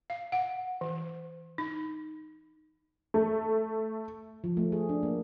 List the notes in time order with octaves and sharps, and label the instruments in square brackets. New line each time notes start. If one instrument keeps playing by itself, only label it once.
[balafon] F5
F#5
E3
D#4
[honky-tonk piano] A3
[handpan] F3
A3
G#4
D4
A#3